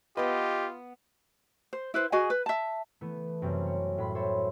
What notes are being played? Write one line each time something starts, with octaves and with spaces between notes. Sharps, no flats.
B3 F4 G4 B4 D#5
C5
E4 B4 C5
F#4 G#4 D#5 G#5
B4
E5 A5
E3 A3 B3
F#2 C3 G3 C4
C#5
A2 B5 C6
A4 C5 C#5 E5 B5